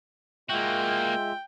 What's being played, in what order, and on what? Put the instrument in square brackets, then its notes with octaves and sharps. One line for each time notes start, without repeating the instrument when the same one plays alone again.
[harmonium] G#3 F4 E5 [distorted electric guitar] A#3 F#4 [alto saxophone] G5